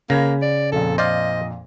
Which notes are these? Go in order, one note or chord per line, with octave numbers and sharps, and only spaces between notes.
C#3 A#3 B5 G#6 A#6
D5
A#1 F2 A#2 A4
C5 D5 D#5 F5